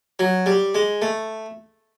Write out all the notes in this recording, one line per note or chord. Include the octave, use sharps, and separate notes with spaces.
F#3
G3
G#3
A3